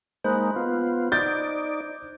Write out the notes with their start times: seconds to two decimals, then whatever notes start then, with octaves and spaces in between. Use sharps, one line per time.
0.24 G#3 A#3 D#4 C5 B5 F#6
0.56 B3 F4
1.12 D#4 D5 G6 A6